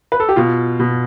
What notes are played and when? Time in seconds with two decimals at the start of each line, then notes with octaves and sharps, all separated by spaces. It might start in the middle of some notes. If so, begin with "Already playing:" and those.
0.12 B4
0.20 A4
0.29 G4
0.36 B2 F4
0.80 B2